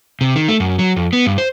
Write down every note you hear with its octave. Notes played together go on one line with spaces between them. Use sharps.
C3
D#3
A3
F#2
F#3
F2
B3
G2
C5